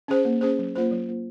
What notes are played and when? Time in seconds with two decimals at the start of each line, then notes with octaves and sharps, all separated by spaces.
0.08 C#4 G#4 C5
0.25 A#3
0.41 C#4 G#4 C5
0.59 F#3
0.76 A#3 F4 C5
0.92 F#3
1.08 A#3 F4 C5